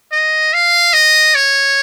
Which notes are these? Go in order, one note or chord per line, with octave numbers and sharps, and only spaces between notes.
D#5
F5
D#5
C#5